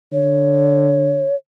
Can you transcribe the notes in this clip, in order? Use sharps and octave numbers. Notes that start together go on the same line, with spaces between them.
D3 C#5